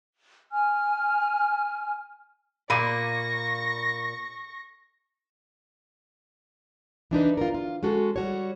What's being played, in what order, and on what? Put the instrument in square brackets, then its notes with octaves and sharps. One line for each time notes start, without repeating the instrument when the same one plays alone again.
[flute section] G#5 F6
[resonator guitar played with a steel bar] A#2 A#3 [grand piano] B5 D#7 [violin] C#6 A#6
[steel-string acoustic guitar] E3 D4 D#4 B4
F4 A#4
F4
G#3 C#4 F#4 A4
G3 F#4 C#5